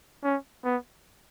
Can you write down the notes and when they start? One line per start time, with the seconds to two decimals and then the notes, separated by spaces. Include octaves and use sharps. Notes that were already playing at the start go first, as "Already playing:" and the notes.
0.24 C#4
0.64 B3